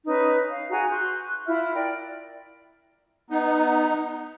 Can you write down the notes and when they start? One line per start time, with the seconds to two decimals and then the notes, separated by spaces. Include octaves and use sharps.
0.06 C#4 D#4 B4
0.49 F5
0.70 F#4 G#4 G#5 A#5
0.90 C6 C#6 F#6 G6
1.47 E4 F4 E5 F6
1.74 A#4 D5 G5
3.30 B3 D#4